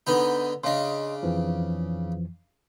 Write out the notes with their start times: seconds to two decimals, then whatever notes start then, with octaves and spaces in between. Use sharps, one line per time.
0.07 D3 B3 D#4
0.64 C#3 D4 D#5 C6
1.23 F2 E3 F3